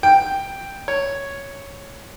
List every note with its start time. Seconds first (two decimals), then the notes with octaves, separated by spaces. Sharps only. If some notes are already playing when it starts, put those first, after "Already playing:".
0.03 G5
0.88 C#5